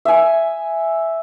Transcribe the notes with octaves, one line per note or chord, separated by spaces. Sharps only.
E5 G#5